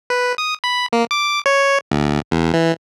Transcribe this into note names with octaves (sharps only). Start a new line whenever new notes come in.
B4
D#6
B5
A#3
D6
C#5
D2
E2
E3